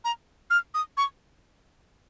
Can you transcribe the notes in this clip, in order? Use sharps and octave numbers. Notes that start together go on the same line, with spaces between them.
A#5
F6
D#6
C#6